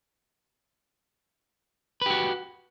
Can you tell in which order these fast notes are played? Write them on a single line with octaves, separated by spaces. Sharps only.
B4 G4 F#4